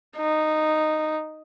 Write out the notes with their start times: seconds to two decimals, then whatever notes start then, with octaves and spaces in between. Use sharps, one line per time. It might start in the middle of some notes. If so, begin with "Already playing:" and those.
0.16 D#4